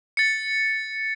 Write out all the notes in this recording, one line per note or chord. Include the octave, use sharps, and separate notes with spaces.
A6 C#7